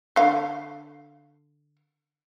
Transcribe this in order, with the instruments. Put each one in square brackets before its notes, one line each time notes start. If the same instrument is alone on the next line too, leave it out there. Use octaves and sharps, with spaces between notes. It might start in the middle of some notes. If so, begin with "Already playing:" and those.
[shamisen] D3 F5